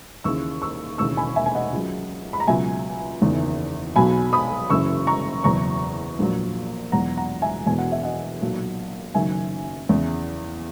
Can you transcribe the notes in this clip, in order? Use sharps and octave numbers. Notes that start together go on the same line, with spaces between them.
D#2 C#3 E3 C#6 E6
C#6 E6
E1 D#2 C#3 E3 C#6 E6
G#5 B5
E5 G#5
G#5
D#5 F#5
C#2 C#3 F#3
B5
A#5
C#2 B2 F#3 E5 G#5
F#1 E2 D#3
B1 B2 F#3 G#5 B5
B5 D#6
F#1 F#2 E3 C#6 E6
A#5 C#6
F#1 E2 B2 F#3 A#5 C#6
A#1 A#2 F#3
E2 B2 F#3 F#5 A#5
F#5 A#5
E5 G#5
E1 E2 B2 G#5
F#5
E5
D#5 F#5
B1 A#2 F#3
F#1 F#2 D#3 F#3 E5 G#5
E2 C#3 E3